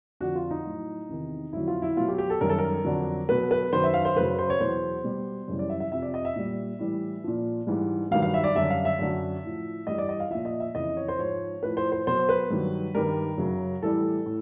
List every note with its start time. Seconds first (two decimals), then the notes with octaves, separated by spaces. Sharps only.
0.20 F2 D3 F3 F#4
0.35 F4
0.51 D#4
0.65 A2 F#3
1.09 E2 C3 D#3
1.53 F2 D3 F#3 E4
1.68 F4
1.82 E4
1.97 B2 F#3 F4
2.08 G4
2.18 G4
2.30 A4
2.41 F#2 D#3 G3 A#4
2.49 A4
2.58 A#4
2.85 F2 D3 F#3
3.29 B2 F#3 B4
3.51 B4
3.73 F#2 D#3 F#3 C5
3.84 E5
3.94 F5
4.05 C5
4.16 F#2 C#3 F#3 B4
4.39 C5
4.50 C#5
4.60 E2 B2 F#3 C5
5.04 B2 G3
5.48 F#2 C#3 E3 G3
5.59 D5
5.70 E5
5.80 E5
5.92 F2 C3 F3 E5
6.02 D5
6.14 D#5
6.25 E5
6.36 A#2 G3
6.79 A2 E3 G3
7.24 A#2 F3
7.67 G#2 E3 G3
8.11 G2 D#3 F#3 F5
8.22 F5
8.34 E5
8.44 D5
8.55 F#2 D3 G3 E5
8.70 F5
8.85 E5
8.99 F#2 D3 F#3
9.44 A2 F3
9.87 G2 E3 G3 D#5
9.98 D5
10.09 D#5
10.20 F5
10.30 A#2 F3 E5
10.45 D#5
10.60 E5
10.75 F2 C#3 E3 D#5
10.97 C#5
11.08 C5
11.19 G#2 F3 C#5
11.63 A2 F3 B4
11.77 C5
11.92 C5
12.07 B2 F#3 C5
12.29 B4
12.50 G2 D#3 F#3
12.95 G2 D#3 G3 A#4
13.38 F#2 C#3 F#3
13.82 A2 E3 G3 A4
14.26 A2